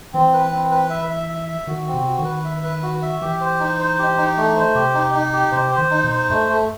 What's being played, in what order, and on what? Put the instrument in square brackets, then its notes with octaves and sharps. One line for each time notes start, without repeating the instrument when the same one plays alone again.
[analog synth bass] E3 [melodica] C4
[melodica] B4
C4
B4
E5
E5
E5
E5
[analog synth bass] D#3 [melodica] F#4
[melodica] C4
[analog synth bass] C3
[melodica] F#4
[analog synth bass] D#3
[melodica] B4
E5
B4
F#4
E5
[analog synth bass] E3 [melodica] G4
[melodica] C5
D#4
C5
G4
D#4
A3
C5
[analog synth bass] C3 [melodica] G4
[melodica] D#4
D#4
G4
[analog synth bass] C3 [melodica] C5
[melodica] C5
[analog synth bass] D#3
[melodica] D#4
[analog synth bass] B2
[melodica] C5
[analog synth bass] G2 [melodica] A3
[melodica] A3